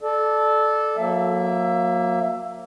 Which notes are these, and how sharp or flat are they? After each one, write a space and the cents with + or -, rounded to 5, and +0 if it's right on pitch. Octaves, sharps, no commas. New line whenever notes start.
A4 -15 D5 +20
F#3 -35 A#3 +0 E5 +15